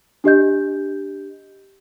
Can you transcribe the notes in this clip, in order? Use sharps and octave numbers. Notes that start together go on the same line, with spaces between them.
D4 G4 D#5 G6